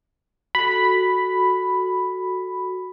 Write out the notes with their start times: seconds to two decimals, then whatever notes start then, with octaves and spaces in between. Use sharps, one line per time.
0.55 F#4 A4 B5